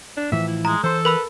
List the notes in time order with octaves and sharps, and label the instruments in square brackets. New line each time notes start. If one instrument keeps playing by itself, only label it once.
[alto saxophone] D4
[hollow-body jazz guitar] A2 E3 F3 [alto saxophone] E5
[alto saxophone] E4
[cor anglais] G#3 [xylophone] A#5
[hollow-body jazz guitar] E3 C6 [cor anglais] A4 [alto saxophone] C5
[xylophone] A#4 B5 E6 [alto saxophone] B4